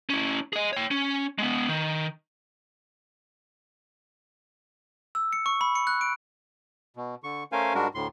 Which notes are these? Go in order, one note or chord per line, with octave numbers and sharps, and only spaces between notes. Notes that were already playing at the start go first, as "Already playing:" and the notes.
C#4 E4
G#4 D#5
C#5 G5
C#4
G#3 B3
D#3
E6
C#7
C#6
B5
C#7
F#6
D7
B2
D3 C#6
A3 C#4 A#4 C5 F5 G#5
G#2 G3 G#3 D4 F#4 A#4
D2 A2 C6